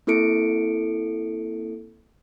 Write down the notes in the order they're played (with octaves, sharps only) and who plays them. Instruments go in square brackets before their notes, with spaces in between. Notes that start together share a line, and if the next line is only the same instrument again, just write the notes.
[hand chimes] A#3 C4 E4 A4 C#7 D7